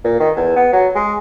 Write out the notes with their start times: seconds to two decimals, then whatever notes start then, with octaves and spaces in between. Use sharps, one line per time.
0.04 A#2
0.20 D#3
0.36 E2
0.56 B3
0.73 F#3
0.95 G#3